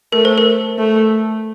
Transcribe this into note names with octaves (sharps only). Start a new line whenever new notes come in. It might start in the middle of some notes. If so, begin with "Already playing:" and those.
A3 A#4
C5
A#4
A3